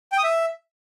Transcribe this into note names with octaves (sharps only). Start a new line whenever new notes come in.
G5
D#6
E5